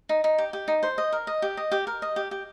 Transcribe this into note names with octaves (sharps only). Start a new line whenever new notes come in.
D#4
D#4
G4
G4
D#4
C5
D#5
A#4
D#5
G4
D#5
G4
A#4
D#5
G4
G4